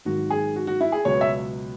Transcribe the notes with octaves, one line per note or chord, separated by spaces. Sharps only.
G#1 G#2 D#3 F#3 F#4
G#4
F#4
F#4
E4
G#4
C#2 B2 F#3 C#5
E5